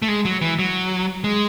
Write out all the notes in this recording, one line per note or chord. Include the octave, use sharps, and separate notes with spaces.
A3
G#3
F#3
E3
F#3
G#3